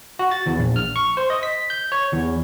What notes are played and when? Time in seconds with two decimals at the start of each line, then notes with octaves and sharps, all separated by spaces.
0.19 F#4
0.31 A6
0.46 E2
0.58 A#1
0.76 F6
0.96 C#6
1.17 C5
1.30 D#5
1.43 B6
1.70 G6
1.92 C#5
2.12 E2